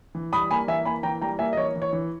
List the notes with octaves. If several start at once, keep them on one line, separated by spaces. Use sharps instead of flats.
E3
G3 B5 D#6
A#3 G#5 B5
E3 E5 G#5
A#3 G#5 B5
E3 G5 A#5
G3 G5 A#5
A#3 E5 G#5
D#5
E3 C#5
E3
C#5
E3